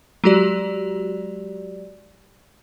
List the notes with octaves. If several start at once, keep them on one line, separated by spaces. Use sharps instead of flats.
F#3 G#3 F#4 G4 D5